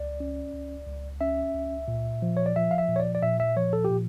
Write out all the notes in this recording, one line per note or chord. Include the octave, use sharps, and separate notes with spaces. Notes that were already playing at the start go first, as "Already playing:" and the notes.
Already playing: C#2 D5
C#4
C#2
C#2
C#4 E5
C#2
A#2
F3
C#5
D5
F3 E5
F5
E5
A#2
C#5
D5
D5
A#2 E5
E5
F3 C#5
A4
G4
A#2